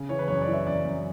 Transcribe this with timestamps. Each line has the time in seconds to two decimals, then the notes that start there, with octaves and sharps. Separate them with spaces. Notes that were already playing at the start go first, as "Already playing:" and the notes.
Already playing: C#3
0.09 E3 C#5
0.19 B4
0.28 F#2 C#5
0.42 D5
0.48 E3
0.53 E5
0.66 F#2 D5
0.85 F#2